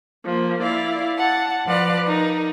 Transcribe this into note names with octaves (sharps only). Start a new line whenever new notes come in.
F3 A#3
E4 D5 F5
F#5 A5
F3 B4 D5 F5 F#6
D#4 A#4